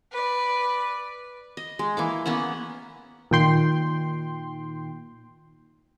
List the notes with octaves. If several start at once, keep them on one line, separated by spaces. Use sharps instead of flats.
B4 D5
D#5
G#3
E3 A#3 D6
A#3 B3 C#4 F#5
A#2 D#3 G5 C6